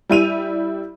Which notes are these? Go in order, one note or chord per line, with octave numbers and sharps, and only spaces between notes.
G3 E4 D#7 F7